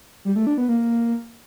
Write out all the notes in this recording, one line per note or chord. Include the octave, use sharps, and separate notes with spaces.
G3
A3
D4
B3
A#3